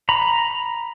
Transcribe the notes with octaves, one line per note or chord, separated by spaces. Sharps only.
A#5 B5